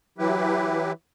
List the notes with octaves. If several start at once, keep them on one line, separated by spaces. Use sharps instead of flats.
E3 F#3 E4 G4 B4